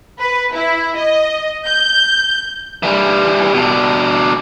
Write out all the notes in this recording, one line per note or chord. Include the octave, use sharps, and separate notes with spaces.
B4
E4
D#5
G6
E3 G3
B2 D4